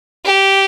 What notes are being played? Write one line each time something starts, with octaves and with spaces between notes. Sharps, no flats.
G4